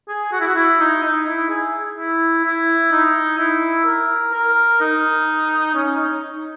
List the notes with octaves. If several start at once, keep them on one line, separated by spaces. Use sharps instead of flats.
G#4
F#4
E4
F#4
E4
D#4
D#4
E4
G#4
E4
E4
D#4
E4
A#4
A#4
D#4
C#4
D#4